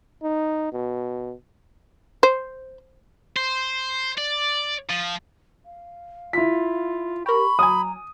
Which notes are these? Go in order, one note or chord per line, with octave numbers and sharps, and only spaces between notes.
D#4
B2
C5
C5
D5
F3
F5
E4 F4 B6
G4 A#4 B5 C#6
F#3 G#5 A#5 D#6